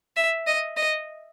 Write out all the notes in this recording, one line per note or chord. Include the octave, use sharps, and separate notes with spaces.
E5
D#5
D#5